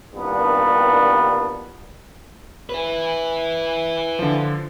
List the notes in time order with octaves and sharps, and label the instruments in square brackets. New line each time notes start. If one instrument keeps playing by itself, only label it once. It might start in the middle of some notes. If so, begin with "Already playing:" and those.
[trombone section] C2 G2 A#2 D#3 B3 D4
[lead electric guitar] E4 B4
[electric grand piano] D3 F3